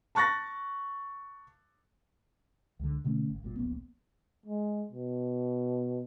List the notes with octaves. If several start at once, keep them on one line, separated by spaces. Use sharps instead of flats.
A5 C#6 F#6 A6 A#6
C#2 D3
B2 D3 A3 C#4
G#1
G1 G2 A#2
D1 A#1 A#3 B3
G#3
B2